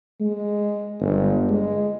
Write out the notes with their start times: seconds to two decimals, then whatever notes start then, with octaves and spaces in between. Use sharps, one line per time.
0.20 G#3
1.01 G1
1.49 G#3